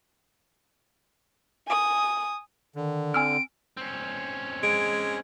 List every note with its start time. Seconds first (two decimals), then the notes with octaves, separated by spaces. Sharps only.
1.67 G#5 D#6
2.76 D3 D#3
3.14 C4 G#5 E6 F6 D7
3.77 C4 C#4
4.63 G#3 D7